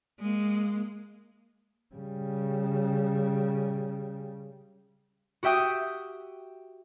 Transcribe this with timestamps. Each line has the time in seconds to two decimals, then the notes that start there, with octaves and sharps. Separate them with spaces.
0.20 G#3 A#3
1.95 C#3 G3
5.43 F#4 G4 E5 G5 D#6